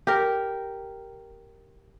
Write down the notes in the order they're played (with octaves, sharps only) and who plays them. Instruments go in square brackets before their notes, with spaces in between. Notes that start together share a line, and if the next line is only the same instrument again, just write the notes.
[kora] G4 A#4